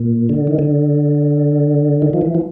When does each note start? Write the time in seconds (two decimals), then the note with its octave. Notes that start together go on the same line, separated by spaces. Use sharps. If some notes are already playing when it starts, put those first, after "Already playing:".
Already playing: A#2
0.29 D3
0.47 D#3
0.59 D3
2.02 D#3
2.13 F3
2.21 E3
2.35 F3